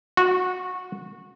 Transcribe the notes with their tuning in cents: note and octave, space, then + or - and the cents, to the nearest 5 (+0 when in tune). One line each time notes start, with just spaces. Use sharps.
F#4 -20